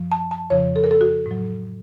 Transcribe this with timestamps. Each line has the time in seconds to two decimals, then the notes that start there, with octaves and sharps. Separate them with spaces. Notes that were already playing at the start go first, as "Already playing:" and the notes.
Already playing: F#2 F3
0.12 A5
0.31 A5
0.50 F2 C#3 F3 C#5
0.76 A4
0.84 A#4
0.91 A4
1.01 F#4
1.26 A2 F#3